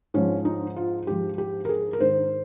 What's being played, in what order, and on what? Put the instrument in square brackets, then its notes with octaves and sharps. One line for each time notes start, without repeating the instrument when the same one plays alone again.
[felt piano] G#2 F3 C#4
D#4
F4
G#2 F3 G4
G4
A#4
G#4
A#4
G#2 D#3 C5